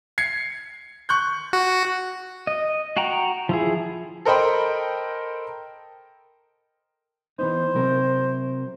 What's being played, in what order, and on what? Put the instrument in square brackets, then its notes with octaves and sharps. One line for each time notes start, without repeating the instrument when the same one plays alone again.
[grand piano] G#6 C7 C#7
C#6 F#6 G6
[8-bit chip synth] F#4
[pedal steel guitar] D#5
F#4 F#5 G5 A#5
F3 E4 G#4
[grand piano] A4 A#4 C5 D#5 G5 B5
[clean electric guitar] E3 B3 D#4 [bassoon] C5
[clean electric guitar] C3 F#3 A#4